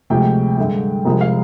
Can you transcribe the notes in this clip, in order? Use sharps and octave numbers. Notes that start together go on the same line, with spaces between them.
D2 C3 F3 G#3 G5
G2 D3 G#3
C2 C3 F3 G#3
F5